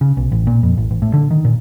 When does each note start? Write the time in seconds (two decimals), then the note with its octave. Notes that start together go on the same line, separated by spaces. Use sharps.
0.01 C#3
0.17 B1
0.32 A1
0.47 A#2
0.63 F2
0.78 A1
0.91 A1
1.02 A2
1.14 D3
1.31 D#3
1.45 A#2